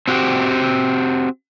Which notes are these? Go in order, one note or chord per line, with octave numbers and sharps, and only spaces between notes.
C4 F#4 G4